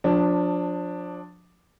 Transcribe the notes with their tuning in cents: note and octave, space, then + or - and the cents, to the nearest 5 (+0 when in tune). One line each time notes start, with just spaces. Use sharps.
F3 +30 D4 +0